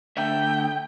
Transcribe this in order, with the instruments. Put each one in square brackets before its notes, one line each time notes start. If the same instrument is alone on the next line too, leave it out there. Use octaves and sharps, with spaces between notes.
[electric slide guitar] D3 A3 E5 [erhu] G5